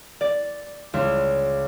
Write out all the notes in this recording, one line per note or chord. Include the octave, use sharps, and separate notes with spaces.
D5
C#2